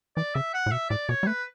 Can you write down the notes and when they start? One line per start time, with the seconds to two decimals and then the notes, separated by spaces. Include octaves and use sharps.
0.17 E3 D5
0.35 C#3 E5
0.54 F#5
0.66 A2
0.72 B2 E5
0.90 A2 D5
1.09 B2 C#5
1.23 G3
1.27 A3 B4